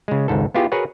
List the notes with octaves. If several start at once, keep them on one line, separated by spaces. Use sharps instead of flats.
C#3 G#3
G#1 C#2 G#2 A4
B3 E4 F4 G4 G#4
F#4 G#4 A#4 B4 C#5 F#5